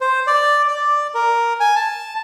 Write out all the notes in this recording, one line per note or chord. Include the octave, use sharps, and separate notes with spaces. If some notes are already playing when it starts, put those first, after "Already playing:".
C5
D5
D5
A#4
G#5
A5